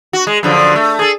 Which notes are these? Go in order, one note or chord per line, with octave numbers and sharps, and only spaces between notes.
F#4
G#3
F#2 D3 F3
A3
G#4 A4